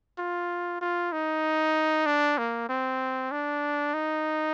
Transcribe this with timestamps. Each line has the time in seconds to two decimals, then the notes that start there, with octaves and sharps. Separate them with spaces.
0.18 F4
0.81 F4
1.12 D#4
2.06 D4
2.38 A#3
2.69 C4
3.31 D4
3.94 D#4